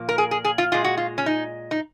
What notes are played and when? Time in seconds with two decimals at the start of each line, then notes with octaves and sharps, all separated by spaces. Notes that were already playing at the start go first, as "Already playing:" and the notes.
Already playing: A#2 F3 A#3
0.09 A#4
0.18 G#4
0.31 G#4
0.44 G#4
0.58 F4
0.72 A#2 G#3 F4
0.84 F#4
0.97 F4
1.18 C#4
1.26 D#4
1.71 D#4